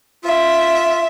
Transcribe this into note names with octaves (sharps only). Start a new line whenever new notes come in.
F4 E5